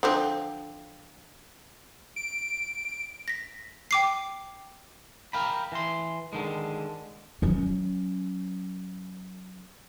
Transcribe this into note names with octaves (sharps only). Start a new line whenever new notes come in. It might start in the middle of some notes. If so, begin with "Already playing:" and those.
D3 F3 C4
D7
A#6 B6
G5 D6 C7
A#4 F5 G5 B5
E3 C6
D3 D#3 G#3
F#3 C#4